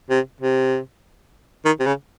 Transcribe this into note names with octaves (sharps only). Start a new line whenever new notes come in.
C3
C3
D#3
C3
C#3